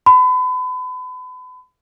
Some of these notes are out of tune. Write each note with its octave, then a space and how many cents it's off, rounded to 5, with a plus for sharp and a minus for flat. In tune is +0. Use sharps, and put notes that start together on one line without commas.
B5 +35